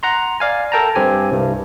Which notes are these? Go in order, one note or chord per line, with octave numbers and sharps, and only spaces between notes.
F#5 A#5 C6
D5 F5 G#5
A4 A#4 G5 A5 A#5
G2 C4 G4 G#5
C2 G2